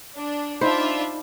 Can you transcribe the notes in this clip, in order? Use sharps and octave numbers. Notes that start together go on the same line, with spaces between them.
D4
D4 D#4 F4 C5 E5 B5